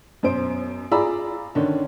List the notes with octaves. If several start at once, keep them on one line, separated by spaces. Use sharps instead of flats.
F#2 B2 C5 D7
F4 G#4 D5 A#5 B5 E6
D3 D#3 C#4 D4